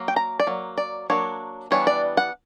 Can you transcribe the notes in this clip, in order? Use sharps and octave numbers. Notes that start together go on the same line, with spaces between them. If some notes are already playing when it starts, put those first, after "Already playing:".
Already playing: F#3 A#3
G5
A#5
D5
F#3 A#3
D5
F#3 A#3 D4 C#5
E3 G3 B3 D4 C#5
D5
F#5